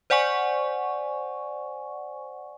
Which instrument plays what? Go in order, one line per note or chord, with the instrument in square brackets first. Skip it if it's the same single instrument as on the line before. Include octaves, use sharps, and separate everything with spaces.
[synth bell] C5 D5 F#5 G#5 C#6